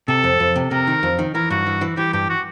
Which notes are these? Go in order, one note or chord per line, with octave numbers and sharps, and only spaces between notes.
C3 A4
F2
F2
C3
C3 A#4
D#3
F2
D#3
E3 A#4
G2 F#4
E3
E3
E3 G4
G2 G4
F#4